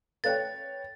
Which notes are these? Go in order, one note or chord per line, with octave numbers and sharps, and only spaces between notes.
A4 B4 C#5 F5 G5 F#6 A6